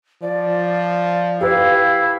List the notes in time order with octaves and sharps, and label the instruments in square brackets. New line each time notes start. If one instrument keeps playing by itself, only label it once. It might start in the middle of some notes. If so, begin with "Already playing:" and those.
[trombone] F3 [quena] D5
[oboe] E4 [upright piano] G4 B4 [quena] F5